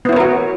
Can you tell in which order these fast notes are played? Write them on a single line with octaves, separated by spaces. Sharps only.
B3 E4 C#5 A#4 F#4